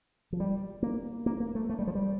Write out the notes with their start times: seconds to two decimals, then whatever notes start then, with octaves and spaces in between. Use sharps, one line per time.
0.33 F3
0.40 G3
0.82 A#3
1.26 A#3
1.40 A#3
1.55 A3
1.69 A3
1.79 G3
1.87 F3
1.95 G3